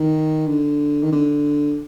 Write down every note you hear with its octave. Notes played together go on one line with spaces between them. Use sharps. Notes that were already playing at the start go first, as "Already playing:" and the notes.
Already playing: D#3
D3
D#3
D3